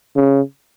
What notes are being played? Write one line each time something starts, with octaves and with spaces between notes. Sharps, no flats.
C#3